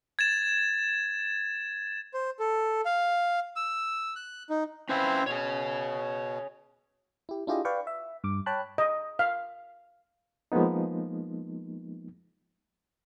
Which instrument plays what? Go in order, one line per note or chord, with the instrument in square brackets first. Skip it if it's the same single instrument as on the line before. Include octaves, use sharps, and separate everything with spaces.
[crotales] G#6 A6 E7
[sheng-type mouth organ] C5
A4
F5
E6
F#6
D#4
[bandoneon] C4 E4 C5 [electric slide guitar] C#4 B4 F5
[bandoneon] B2 [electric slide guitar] G#4 C#5
[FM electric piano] E4 G4
D4 E4 F4 G4 G#4 D#5
B4 D5 F5 G5 C#6
E5
G2 D6
C#5 G5 A5 B5 F#6
[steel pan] D#5
F5
[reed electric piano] F3 G#3 A#3 B3 D#4